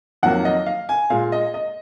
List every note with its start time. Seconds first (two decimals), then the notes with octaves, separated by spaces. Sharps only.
0.23 F2 D#3 F#3 A#3 F#5
0.45 D#5
0.66 F5
0.89 G#5
1.10 A#2 G#3 F5
1.32 D#5
1.54 D#5